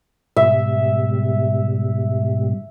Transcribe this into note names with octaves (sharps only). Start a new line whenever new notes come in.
G#2 B2 G3 E5